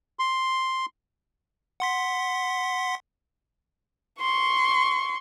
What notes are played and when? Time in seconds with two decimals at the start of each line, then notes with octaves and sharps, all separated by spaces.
0.19 C6
1.80 F#5 C6 B6
4.21 C6 C#6